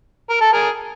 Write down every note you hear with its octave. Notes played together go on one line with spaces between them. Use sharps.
A#4
A4
G#4 A#4